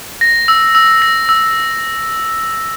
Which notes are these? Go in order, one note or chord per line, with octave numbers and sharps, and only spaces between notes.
A#6
E6
E6
A#6
E6